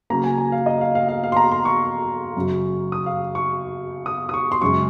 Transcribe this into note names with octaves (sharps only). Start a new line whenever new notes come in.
C#3 F#3 A#3 A#5
G#5
G#5
F5
D#5
F5
F5
F5
F5
C6
A#5
C6
C#6
F#2 C#3 F#3
D#6
F5
C#6
D#6
D#6
C#6
C6
F#2 C#3 G#3 C#6